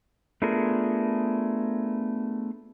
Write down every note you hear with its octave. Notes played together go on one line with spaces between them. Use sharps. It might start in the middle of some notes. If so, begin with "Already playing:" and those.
A3 B3 D4 F4 G#4 A#4